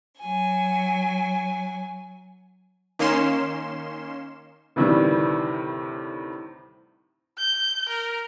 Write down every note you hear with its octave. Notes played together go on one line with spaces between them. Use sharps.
F#3 G#5
D#3 A#3 C#4 C6 E7
D2 A2 C3 D#3 E3 G3
G6
A#4